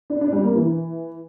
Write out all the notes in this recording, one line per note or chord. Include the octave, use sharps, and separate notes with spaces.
D4
D4
G3
A#3
E3